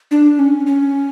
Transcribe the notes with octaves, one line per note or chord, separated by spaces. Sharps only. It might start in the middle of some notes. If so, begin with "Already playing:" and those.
D4
C#4
C#4